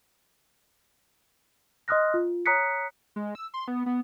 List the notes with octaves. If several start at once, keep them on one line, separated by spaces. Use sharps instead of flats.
D#5 C6 D#6 F6 F#6 A#6
F4
C#5 A#5 D#6 F#6 B6 C#7
G#3
E6
C6
B3
B3